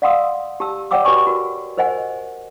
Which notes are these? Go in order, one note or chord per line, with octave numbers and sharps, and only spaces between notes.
D5 F5 F#5 C6 D#6 E6
G4 A5 E6
C#5 D5 F#5 G5 D6 E6
F#4 G4 B4 G#5 C#6 D6
F#4 A#4
A#4 C5 D#5 F#5 G#5